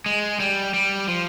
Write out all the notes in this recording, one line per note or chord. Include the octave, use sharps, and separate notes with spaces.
G#3
G3
G3
F3